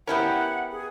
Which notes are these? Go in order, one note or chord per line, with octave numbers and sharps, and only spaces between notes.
B3 C#4 E4 G4 A#4 F#5 G5
G#4